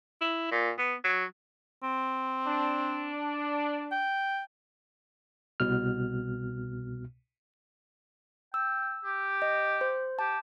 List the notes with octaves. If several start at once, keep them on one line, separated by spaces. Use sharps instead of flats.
E4
A#2
B3
F#3
C4
D4
G5
C2 B2 F6
G5 E6
G4
D#5
C5
G4 A5